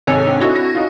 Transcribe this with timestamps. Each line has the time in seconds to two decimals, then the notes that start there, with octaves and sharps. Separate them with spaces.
0.07 G#2 C3 D#3 A4 C#5 G#5
0.27 C4 D4
0.40 D#4 E4 F#4 A4
0.55 A#6
0.75 D#4 F4